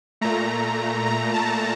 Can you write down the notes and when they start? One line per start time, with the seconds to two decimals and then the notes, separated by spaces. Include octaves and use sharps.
0.21 A#2 A3 A#5
1.06 A#5
1.34 A5